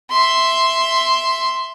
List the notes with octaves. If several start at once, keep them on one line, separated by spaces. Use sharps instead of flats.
E5 C6